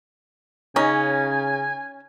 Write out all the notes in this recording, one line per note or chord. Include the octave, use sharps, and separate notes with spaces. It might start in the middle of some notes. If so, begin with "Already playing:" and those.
C#3 C#4 D#4 G#5